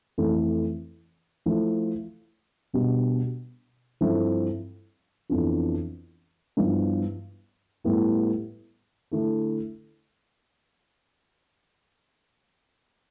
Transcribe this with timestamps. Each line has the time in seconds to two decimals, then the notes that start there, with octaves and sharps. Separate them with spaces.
0.18 F2 E3 A3
1.46 F3 A3 E4
2.73 B2 G3 D4 G4
4.01 G2 F3 C4 E4 A4
5.29 F2 E3 B3 D4 F4
6.57 G2 F3 B3 E4
7.84 A2 G3 B3 E4 G4
9.12 D3 A3 E4 A4